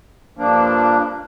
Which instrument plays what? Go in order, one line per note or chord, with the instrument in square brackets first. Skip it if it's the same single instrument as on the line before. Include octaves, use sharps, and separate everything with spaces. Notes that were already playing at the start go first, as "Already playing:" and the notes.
[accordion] G2 F3 A#3 D4